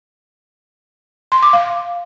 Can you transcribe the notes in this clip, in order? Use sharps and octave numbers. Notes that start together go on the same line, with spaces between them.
C6
D6
F5